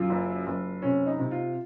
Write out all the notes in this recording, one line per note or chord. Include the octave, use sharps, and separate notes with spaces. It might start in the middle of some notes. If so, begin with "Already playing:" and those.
Already playing: F#2 F4
F#1
F#1
C3 C#4
D#4
C3
F4